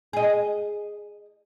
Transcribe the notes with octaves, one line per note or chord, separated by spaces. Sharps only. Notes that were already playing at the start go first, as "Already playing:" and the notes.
G#4 D#5